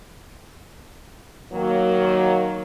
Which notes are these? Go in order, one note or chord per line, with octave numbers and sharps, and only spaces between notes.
D#3 F#3 A#3